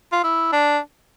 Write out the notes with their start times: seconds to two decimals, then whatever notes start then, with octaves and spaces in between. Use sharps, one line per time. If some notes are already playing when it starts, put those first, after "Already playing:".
0.12 F4
0.24 E4
0.52 D4